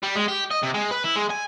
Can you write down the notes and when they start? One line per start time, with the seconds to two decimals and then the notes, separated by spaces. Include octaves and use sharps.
0.03 G3
0.16 G#3
0.28 G4
0.51 D#5
0.63 C3
0.74 G#3
0.91 B4
1.04 E4
1.16 G#3
1.30 G#5